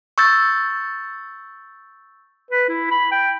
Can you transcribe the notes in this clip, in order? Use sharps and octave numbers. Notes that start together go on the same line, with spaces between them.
C#6 E6 G6 A6
B4
E4
B5
G5